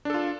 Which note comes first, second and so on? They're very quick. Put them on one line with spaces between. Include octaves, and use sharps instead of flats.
D4 A4 F4